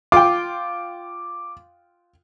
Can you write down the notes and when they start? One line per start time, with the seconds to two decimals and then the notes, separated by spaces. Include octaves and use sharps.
0.12 F4 G5 D6